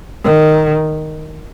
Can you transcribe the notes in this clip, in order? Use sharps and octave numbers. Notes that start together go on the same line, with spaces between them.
D#3